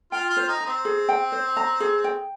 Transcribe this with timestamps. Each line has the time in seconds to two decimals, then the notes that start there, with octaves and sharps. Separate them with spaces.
0.12 F4 G5
0.30 F4
0.37 C5
0.48 D#4
0.60 A#5
0.66 C4
0.85 G#4
1.09 G5
1.32 C5
1.57 A#5
1.80 G#4
2.04 G5